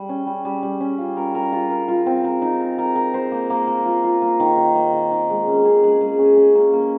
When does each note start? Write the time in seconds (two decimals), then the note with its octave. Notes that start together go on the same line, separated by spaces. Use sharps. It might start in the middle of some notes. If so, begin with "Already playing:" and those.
Already playing: G3
0.09 C#4
0.27 G3
0.45 G3
0.63 G3
0.80 C#4
0.99 F4
1.17 A#4
1.35 A#4
1.52 F4
1.70 A#4
1.88 F4
2.06 C4
2.24 A#4
2.42 D#4
2.60 A#4
2.78 A#4
2.96 A#4
3.14 C5
3.32 A#3
3.50 A#3
3.67 A#3
3.85 F4
4.04 F4
4.22 A#3
4.40 D#3
4.57 D#3
4.75 A#3
4.93 D#3
5.11 D#3
5.30 G#3
5.47 C#4
5.65 G#4
5.83 G#3
6.01 G#3
6.19 C#4
6.37 C#4
6.55 A#3
6.73 A#3